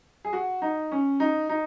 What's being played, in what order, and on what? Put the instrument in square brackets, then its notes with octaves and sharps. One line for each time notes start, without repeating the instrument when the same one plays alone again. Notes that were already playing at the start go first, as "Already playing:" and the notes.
[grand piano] G#4
F#4
D#4
C#4
D#4
D#4